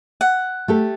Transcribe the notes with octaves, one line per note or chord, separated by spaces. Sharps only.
F#5
A3 G4 A4